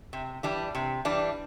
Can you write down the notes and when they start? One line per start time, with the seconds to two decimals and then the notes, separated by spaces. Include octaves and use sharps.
0.13 C3
0.43 E3 G3 D4
0.75 C3
1.05 E3 G3 D4